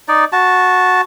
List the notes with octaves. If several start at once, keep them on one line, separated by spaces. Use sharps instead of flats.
D#4 D5
F#4 A5